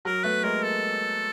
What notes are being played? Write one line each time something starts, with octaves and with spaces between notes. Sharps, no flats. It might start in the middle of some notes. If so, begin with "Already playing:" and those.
F#3 A#4
A3 B3 B4
G#3 A#3 A#4
A4